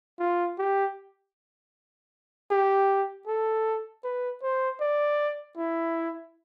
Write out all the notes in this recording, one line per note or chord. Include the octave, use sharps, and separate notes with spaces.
F4
G4
G4
A4
B4
C5
D5
E4